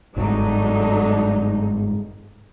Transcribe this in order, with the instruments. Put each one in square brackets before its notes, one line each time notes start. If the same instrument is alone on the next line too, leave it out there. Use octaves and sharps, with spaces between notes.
[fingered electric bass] G1 G#2 [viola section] F#3 A3 D#4 [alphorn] D4